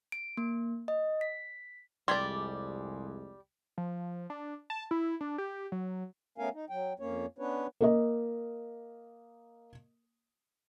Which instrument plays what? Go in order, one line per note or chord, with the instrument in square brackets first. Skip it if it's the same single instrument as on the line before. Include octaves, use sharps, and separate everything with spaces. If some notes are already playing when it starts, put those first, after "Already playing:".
[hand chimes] D7
A#3
D#5
B6
[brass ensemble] C2 F2 G#3 [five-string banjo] G3 D5 [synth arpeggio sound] C6 G#6 B6
[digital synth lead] F3
D4
A5
E4
D4
G4
F#3
[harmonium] A3 B3 C#4 A#4 F5 G#5
D#4
F#3 G5
F2 A#3 C#4 C#5
B3 C#4 D4 B4 C#5
[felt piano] A#3 A#4 D#5